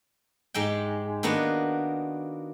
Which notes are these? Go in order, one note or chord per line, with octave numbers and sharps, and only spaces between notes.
G#2 G#3 G4 G5
D#3 A#3 B3 D4 F#4